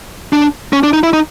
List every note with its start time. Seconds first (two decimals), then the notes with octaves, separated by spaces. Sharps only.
0.33 D4
0.73 C#4
0.83 D4
0.93 D#4
1.03 E4
1.13 D#4